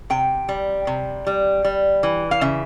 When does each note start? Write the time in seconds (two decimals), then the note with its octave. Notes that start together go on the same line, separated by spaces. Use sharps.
0.10 C3 G5
0.49 G3
0.87 C3
1.27 G3
1.65 G3
2.03 E3
2.31 F5
2.41 C#3 E5